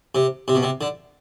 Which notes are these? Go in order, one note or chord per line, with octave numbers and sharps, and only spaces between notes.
C3
C3
B2
C3
D3